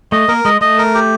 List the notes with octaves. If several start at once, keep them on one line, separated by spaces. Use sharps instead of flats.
A3 D#5
A#3 A#4
G#3 D#5
A3 D#5
A#4
G4